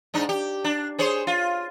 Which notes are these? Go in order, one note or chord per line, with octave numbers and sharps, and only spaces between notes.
G#2 D4 D#4
G4
D4
G#4 C5 C#5
F4